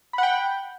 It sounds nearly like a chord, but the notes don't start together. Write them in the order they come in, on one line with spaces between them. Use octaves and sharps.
B5 F#5 G5